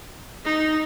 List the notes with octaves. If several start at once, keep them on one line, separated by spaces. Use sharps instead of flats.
D#4